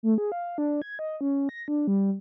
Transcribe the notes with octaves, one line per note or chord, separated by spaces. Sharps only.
A3
G#4
F5
D4
G#6
D#5
C#4
A#6
D4
G3